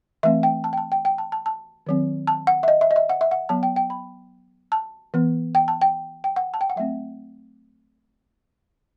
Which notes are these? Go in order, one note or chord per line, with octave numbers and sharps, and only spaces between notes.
E3 A3 C4 E5
G5
A5
G5
A5
G5
G5
A5
A5
A5
D#3 F#3 C4
A5
F#5
E5
D#5
E5
D#5
E5
F#5
E5
F#5
F#3 B3 A5
G5
G5
B5
A5
E3 B3
G5
A5
G5
G5
F#5
A5
G5
F#5
F#3 A3 C4 E5